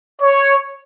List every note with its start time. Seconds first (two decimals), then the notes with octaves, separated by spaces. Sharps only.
0.21 C#5